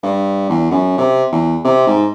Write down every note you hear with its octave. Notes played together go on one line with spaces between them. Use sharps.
G2
E2
F#2
C3
E2
C3
G#2